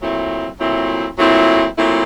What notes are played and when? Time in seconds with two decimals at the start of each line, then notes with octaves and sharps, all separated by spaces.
0.01 A#2 F#3 A3 C4 E4
0.60 A#2 F#3 A3 C4 E4
1.19 A#2 F#3 A3 C4 E4
1.78 A#2 F#3 A3 C4 E4